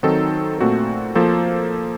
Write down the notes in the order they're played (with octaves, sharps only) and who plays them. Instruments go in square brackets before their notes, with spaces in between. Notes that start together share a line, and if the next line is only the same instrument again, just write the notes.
[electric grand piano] D#3 F#3 C4 D#4 A4
A#2 A3 C4 F#4 A4
F3 A#3 F4 A4 C5